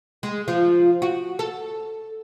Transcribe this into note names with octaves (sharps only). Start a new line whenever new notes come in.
G#3
F3 F4
F#4
A4